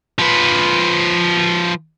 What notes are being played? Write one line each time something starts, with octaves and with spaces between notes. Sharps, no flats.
F3 B4